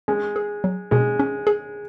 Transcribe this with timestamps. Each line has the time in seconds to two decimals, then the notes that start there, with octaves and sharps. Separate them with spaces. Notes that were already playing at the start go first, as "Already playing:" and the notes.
0.08 G#3 C#4
0.36 G#4
0.64 F#3
0.91 B2 G#3
1.19 C#4
1.47 G#4